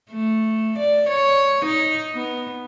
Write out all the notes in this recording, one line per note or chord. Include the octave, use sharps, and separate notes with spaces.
A3
D5
C#5
D#4
B3